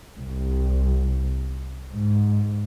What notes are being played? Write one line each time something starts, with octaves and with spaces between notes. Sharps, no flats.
C2
G#2